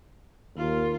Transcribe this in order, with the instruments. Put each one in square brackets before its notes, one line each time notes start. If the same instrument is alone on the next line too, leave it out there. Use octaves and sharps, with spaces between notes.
[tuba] D#2 [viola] F4 A#4